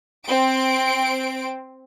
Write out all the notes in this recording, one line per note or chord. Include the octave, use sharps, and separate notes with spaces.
C4 D7